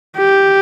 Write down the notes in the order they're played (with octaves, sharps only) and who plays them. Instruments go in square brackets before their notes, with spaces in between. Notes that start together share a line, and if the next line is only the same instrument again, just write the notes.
[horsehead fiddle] G4